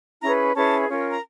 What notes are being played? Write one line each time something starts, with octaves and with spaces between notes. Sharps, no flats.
C#4 E4 G#4 B4 A#5
C#4 E4 G#4 B4 A5
C#4 F4 A#4
A#5